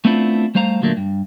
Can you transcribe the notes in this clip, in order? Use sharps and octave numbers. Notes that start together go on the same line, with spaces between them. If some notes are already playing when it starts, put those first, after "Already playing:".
A3 B3 C4 D4 E4 F4
G3 A3 C5 F5 A#5
D2 A#2 F#3 A3 A#3 D4
G2